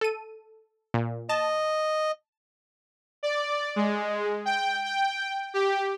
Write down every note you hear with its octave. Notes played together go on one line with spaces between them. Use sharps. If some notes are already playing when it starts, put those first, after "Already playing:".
A4 D#7
A#2
D#5 A5
D5
G#3
G5
G5
G4